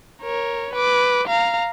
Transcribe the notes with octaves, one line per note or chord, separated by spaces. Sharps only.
A#4 C#5
B4 D6
F5 A#5